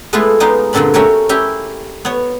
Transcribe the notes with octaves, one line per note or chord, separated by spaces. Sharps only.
G#3 A3 B3 E4 F4 B4
G#3 B3 D#4 G4 F5
G2 A#2 D3 C4 D4 B5
A3 C#4 F#4 G4 A#4 C#5
C#4 E4 G4 G5
B3 C#5